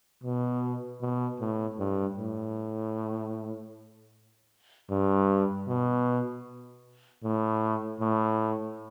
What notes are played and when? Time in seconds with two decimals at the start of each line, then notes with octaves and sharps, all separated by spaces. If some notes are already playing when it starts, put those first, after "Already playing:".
0.23 B2
1.01 B2
1.40 A2
1.79 G2
2.18 A2
4.90 G2
5.67 B2
7.23 A2
8.01 A2